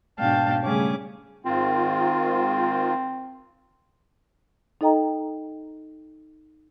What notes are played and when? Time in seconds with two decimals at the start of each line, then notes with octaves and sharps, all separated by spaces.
0.18 G#2 B2 D4 F5 G5 A5
0.62 C#3 G3 A3 C#4 G#4 D6
1.45 G#2 D#3 C4 F4
4.81 D#4 A4 D#5 G5 A#5